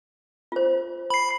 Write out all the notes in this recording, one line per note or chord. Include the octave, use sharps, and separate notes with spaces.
F4 C5
B5 C7